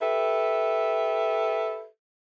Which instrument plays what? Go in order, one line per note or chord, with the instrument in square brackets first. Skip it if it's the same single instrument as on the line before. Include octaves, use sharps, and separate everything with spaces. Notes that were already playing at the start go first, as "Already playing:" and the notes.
[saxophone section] G4 A4 B4 E5